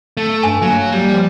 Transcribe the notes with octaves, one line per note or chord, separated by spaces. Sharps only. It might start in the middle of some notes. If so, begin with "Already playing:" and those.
A3
G2 G#5
F#3 A#3
G3
F3